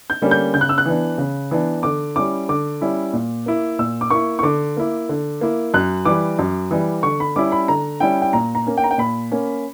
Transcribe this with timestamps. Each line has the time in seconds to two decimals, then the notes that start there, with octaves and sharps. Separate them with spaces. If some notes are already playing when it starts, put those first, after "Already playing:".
0.10 G6
0.21 D3 G3 A#3 C#4
0.31 G6
0.54 C#3 G6
0.61 F#6
0.69 E6
0.78 F#6
0.85 E3 B3 D4
1.18 C#3
1.51 E3 B3 D4
1.83 D3 D6
2.16 G3 C#4 E4 D6
2.49 D3 D6
2.81 G3 C#4 E4
3.13 A#2
3.46 A#3 E4
3.79 A#2 E6
4.01 D6
4.10 A#3 E4 C#6
4.39 C#6
4.43 D3 D6
4.77 A#3 E4
5.09 D3
5.41 A#3 E4
5.74 F#2 F#6
6.05 E3 G3 D6
6.39 F#2
6.71 E3 G3
7.03 D3 C#6
7.20 B5
7.36 G3 C#4 E4 D6
7.52 B5
7.68 D3 A#5
8.00 G3 C#4 E4 G5
8.22 G5
8.33 A#2 A#5
8.55 A#5
8.67 A#3 C#4
8.77 G5
8.84 A#5
8.91 G5
8.98 A#2 B5
9.32 A#3 C#4